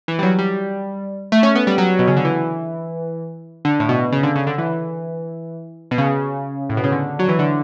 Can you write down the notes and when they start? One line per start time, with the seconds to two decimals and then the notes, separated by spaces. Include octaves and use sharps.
0.08 E3
0.19 G3
0.23 F#3
0.39 G3
1.32 A3
1.43 C#4
1.55 B3
1.67 G3
1.78 F#3
1.99 B2
2.08 C#3
2.16 D3
2.25 E3
3.65 D3
3.80 A2
3.89 B2
4.12 C#3
4.23 D3
4.36 C#3
4.47 D3
4.58 E3
5.91 B2
5.98 C#3
6.70 A2
6.77 B2
6.84 C#3
6.92 D3
7.19 F#3
7.29 E3
7.39 D3